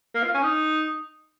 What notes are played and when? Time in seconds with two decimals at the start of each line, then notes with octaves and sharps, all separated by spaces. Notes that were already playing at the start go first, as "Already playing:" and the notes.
0.15 A#3
0.23 F4
0.34 C#4
0.43 D#4